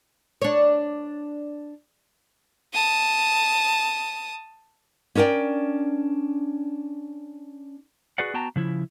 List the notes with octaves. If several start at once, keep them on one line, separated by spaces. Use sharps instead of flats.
D4 C#5
A5 D#6
C#4 D4 A#4 D5 G5
F#4 G#4 B4 D5 F#5
B3 F#4 G5 A5 A#5
C#3 F3 E4